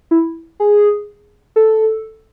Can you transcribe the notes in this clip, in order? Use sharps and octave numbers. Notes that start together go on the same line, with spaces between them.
E4
G#4
A4